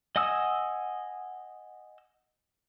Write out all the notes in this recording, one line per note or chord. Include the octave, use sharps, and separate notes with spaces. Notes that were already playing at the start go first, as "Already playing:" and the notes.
D#5 F#5 G#5 D#6 E6